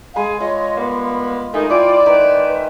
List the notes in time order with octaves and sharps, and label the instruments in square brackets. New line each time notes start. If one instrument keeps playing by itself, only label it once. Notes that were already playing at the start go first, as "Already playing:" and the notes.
[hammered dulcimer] G#3 B5 [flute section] G#4 F5 G#5
[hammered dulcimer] F4 [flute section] C#5 D#5
[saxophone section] G3 A#3 B3 [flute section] B5
[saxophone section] G#3 A3 D#4 [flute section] A#4 [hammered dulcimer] G#5
[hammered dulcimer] E4 C5 G#5 [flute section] F4 G5 [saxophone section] D5
[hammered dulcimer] D#3 [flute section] B4 E5